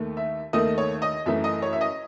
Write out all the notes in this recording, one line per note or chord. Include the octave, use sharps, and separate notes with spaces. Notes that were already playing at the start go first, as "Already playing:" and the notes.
Already playing: D#2 D#3 A3
E5
D#2 D#3 A3 D#5
C#5
D#5
F#2 E3 A3 E5
D#5
C#5
E5
D#5